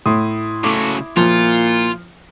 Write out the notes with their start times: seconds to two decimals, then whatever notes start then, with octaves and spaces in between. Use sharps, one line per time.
0.06 A2 E4 C6 D#6
0.64 C#3 F#3 A3 D6
1.17 A#2 F3 F4